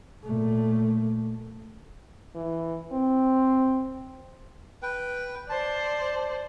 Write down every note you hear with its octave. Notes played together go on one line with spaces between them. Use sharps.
A#2 A3
E3
C4
B4 G5
C5 D5 A5